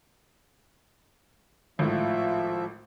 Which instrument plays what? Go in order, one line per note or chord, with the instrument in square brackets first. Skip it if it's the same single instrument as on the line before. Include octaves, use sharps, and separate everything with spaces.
[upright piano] G#1 A2 [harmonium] F3 E5